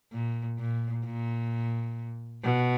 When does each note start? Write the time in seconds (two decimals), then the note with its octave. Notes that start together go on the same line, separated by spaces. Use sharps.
0.12 A#2
0.59 A#2
1.05 A#2
2.43 B2